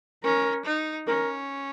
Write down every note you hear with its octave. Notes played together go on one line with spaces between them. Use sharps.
C#4 A#4
D#4
C#4 A#4